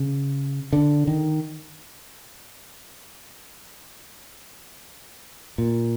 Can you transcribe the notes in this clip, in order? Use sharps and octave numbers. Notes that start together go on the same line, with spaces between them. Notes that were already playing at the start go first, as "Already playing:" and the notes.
Already playing: C#3
D3
D#3
A#2